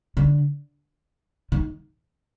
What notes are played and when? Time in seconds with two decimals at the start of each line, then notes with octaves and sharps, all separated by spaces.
0.17 D3
1.52 D#3